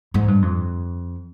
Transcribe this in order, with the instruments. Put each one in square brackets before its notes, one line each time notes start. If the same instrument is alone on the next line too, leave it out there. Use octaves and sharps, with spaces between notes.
[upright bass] G#2
G2
F2